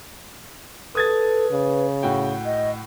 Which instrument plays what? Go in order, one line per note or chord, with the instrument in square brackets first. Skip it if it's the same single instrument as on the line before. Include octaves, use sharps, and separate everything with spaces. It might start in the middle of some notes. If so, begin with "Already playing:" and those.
[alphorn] A4 [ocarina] B4 [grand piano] D#6 G#6 A6
[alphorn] C#3
[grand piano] A2 F#4 G5
[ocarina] D#5